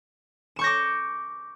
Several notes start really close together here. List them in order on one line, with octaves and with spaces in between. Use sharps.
E7 C#6 G6 A#6 D6